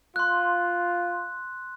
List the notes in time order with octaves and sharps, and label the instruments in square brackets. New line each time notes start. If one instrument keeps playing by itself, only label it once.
[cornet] F4 [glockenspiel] C6 F#6